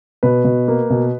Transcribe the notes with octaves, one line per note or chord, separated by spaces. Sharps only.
B2 B4
B2
A#3
B2